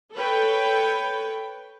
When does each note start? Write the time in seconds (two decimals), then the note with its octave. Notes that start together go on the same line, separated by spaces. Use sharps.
0.15 A4 B4 C#5 G5